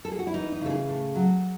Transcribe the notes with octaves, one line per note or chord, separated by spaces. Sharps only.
A4
G#4
F#4
E4
E3 D#4
D#4
C#3 A4
G#4
A2
F#3